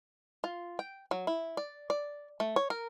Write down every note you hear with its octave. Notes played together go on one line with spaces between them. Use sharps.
F4
G5
F#3
E4
D5
D5
A3
C#5
A#4